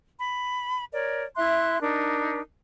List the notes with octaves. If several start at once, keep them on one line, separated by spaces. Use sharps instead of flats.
B5
A#4 C#5 D5
E4 E5 C6 F#6
D4 D#4 A#4